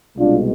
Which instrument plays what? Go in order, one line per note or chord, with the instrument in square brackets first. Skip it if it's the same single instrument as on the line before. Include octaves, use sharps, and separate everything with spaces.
[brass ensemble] C2 B2 G#3 D4 F4